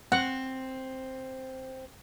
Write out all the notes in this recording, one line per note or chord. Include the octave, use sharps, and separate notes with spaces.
C4 F#5